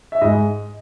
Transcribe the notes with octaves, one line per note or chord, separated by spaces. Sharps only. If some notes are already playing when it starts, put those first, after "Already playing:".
E5
G#2 D#5